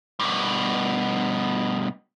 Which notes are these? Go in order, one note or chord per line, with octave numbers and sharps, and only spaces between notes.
G2 B2